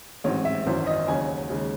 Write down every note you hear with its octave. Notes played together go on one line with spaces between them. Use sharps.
A1 G#2 F#3 C4 C#5
E5
G#1 F#2 E3 C5
D#5
D#2 C#3 F#3 G#5
D#2 C#3 G#3